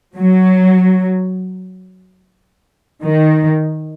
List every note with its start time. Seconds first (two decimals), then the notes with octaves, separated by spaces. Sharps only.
0.17 F#3
3.04 D#3